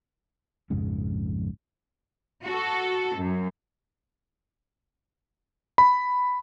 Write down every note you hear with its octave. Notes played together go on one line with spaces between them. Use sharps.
A#1 F2 G#2 C#3
F#4 A4
F#2
B5